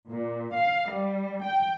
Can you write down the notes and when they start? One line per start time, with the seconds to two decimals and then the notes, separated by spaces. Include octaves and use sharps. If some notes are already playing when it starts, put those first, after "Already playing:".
0.10 A#2
0.54 F5
0.91 G3
1.44 G5